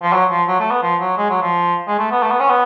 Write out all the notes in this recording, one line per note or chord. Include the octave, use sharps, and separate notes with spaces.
F3
F#3
F3
F#3
A3
B3
F3
F#3
G#3
F#3
F3
G#3
A3
B3
A3
B3
C#4
B3